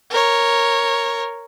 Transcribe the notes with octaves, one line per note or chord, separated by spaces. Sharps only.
A#4 C#5